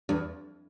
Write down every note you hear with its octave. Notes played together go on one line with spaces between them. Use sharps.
E2 G2